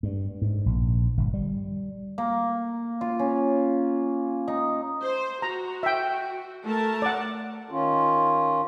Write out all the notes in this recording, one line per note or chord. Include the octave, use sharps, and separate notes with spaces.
G2
G#2
A#1
G1
G3
A#3
F4
C#4
D#4
C5
F#4 A#5
E5 G5
A3 A#4 A5
D5 F#5
D#3 C#4 F4